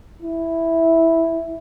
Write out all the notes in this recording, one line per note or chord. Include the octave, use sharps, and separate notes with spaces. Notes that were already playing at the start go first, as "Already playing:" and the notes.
E4